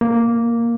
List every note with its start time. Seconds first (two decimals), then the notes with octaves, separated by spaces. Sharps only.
0.01 A#3